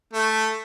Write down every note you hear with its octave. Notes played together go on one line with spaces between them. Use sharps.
A3